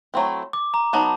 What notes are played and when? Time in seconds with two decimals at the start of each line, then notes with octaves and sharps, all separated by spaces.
0.14 F#3 A3 C4 E4
0.53 D6
0.74 A#5
0.93 F#3 B3 D#4 A5